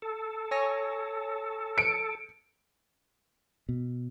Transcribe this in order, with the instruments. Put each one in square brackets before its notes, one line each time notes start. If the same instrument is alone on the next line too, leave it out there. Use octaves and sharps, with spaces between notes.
[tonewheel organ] A4
[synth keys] C#5 G#5 A#6
[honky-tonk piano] C#7 D7
[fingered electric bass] B2